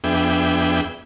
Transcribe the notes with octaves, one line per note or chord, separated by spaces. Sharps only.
F2 B3 D4 G#4 E5 G5